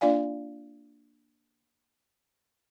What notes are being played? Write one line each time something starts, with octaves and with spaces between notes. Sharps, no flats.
A#3 D4 F4 D5 F5 G#5